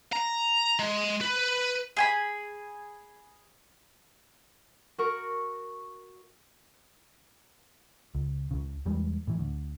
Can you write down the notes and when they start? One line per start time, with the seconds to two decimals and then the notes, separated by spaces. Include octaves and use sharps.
0.13 A#5
0.79 G#3
1.21 B4
1.97 G#4 G#5 B5
4.98 F#4 A#4 C#6
8.15 C#2
8.51 C#2 C#3
8.86 E2 E3 G3 G#3
9.27 A2 E3
9.40 D2